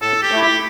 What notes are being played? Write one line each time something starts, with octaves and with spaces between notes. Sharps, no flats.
A2 A4
G4
A3 E4
G4